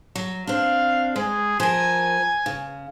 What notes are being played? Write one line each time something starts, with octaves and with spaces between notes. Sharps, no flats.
F#3
C4 D4 F5
G#3 G#4
F3 A#4 G#5
C#3